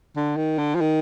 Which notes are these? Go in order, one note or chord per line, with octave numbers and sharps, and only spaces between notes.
D3
D#3
D3
F3
D#3